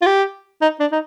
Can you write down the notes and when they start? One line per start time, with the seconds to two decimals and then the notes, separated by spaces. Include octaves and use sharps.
0.01 F4
0.06 G4
0.61 D#4
0.80 D4
0.92 D#4